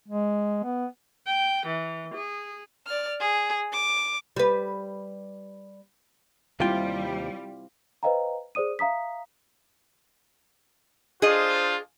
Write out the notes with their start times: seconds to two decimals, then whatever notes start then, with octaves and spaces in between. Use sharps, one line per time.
0.08 G#3
0.63 B3
1.27 G5
1.66 E3
2.14 G#4
2.87 D5 F6
3.20 G#4
3.73 D6
4.36 G3 B4
6.60 D#2 C3 G3 C4 E4 F4 G5
8.03 B4 C5 D#5 F5 G5 A#5
8.55 G#4 C5 D5 D#6 D#7
8.79 E5 F5 A#5 D#6 B6
11.22 D4 F4 G#4 C5 D#5